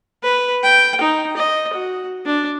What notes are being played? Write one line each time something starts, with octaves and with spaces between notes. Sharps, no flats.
B4
G5
D#4
D#5
F#4
D4